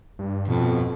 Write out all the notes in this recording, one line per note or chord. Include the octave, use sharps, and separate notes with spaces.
G2
F2 B2